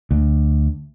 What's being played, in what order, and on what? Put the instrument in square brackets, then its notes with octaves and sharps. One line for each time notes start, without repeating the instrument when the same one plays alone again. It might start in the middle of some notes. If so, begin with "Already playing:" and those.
[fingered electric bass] D2